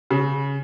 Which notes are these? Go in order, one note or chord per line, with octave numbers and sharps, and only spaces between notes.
C#3